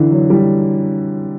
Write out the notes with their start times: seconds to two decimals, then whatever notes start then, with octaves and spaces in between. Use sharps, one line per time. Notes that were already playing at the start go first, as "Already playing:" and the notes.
Already playing: D3 E3
0.11 F#3
0.30 G3